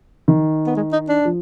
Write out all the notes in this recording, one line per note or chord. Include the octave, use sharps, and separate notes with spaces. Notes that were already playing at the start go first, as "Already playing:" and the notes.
D#3
B3
G#3
D#4
D4
F3